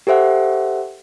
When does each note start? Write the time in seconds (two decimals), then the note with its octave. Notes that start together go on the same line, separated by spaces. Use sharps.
0.07 G4 A4 C5 E5 F#5